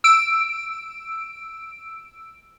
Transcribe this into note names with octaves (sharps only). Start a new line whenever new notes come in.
E6 D7